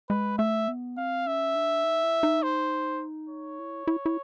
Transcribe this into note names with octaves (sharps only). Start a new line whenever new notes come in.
G#3 B4
A3 E5
B3
C4 F5
C#4 E5
D4
D#4
E4
D#4
C5
C#5
E4
E4
E4